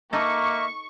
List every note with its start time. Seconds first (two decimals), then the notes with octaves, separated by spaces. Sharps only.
0.13 A#3 D#4 A4 D#5 E5 C#6 D6